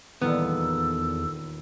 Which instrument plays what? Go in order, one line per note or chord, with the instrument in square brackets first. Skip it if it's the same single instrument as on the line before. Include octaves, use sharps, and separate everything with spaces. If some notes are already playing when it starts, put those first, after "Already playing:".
[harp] D#1 D#3 [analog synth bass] E2 [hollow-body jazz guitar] B3 [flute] A4